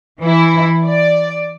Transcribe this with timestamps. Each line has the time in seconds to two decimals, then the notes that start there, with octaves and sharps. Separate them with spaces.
0.21 E3 E4
0.86 D5